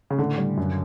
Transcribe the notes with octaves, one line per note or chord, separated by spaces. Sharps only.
C#3
A2 D3
G3
F#2